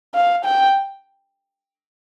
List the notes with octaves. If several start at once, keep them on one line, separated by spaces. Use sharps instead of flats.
F5
G5